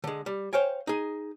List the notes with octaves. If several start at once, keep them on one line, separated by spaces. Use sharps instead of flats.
D3 G#3
G3
C5 C#5 F5 G5 G#5
D#4 G#4